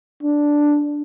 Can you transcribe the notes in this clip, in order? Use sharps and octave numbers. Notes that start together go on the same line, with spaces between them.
D4